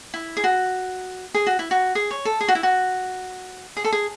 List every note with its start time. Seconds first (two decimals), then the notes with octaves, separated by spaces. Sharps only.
0.14 E4
0.37 G#4
0.44 F#4
1.34 G#4
1.47 F#4
1.59 E4
1.71 F#4
1.95 G#4
2.11 C#5
2.25 A4
2.41 G#4
2.48 F#4
2.55 E4
2.63 F#4
3.77 G#4
3.84 A4
3.93 G#4